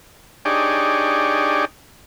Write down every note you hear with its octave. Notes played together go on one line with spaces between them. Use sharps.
D4 D#4 G4 G#4 C#5 D5